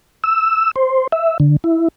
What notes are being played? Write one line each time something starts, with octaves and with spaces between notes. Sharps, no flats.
E6
C5
E5
D3
E4